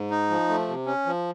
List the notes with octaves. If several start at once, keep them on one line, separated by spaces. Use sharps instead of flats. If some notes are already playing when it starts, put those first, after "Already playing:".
Already playing: G#2
D#4
F3
A3
C3
C#4
F3